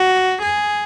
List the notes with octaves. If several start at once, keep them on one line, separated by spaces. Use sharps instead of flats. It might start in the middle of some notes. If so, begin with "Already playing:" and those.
Already playing: F#4
G#4